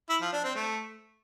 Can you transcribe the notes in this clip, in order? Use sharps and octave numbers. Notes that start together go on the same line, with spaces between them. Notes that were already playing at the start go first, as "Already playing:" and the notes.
E4
F3
D4
C4
A3